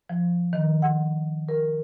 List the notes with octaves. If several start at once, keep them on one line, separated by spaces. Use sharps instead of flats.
F3
D#3
F#5
A#4